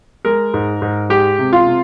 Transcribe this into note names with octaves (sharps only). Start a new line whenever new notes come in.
G#3 A#4
G#2
G#2
G#3 G4
C3
F4
C3